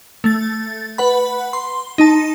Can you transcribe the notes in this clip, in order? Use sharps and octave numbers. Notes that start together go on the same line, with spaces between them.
A3 A6
B4 F#5 B5
C6
D#4 A5